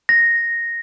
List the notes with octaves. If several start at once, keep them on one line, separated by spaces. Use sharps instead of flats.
A#6